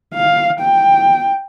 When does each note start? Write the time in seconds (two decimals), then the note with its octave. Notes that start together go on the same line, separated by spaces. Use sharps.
0.15 F5
0.60 G5